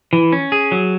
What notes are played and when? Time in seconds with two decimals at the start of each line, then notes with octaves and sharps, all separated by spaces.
0.13 E3
0.32 C#4
0.52 G#4
0.72 F#3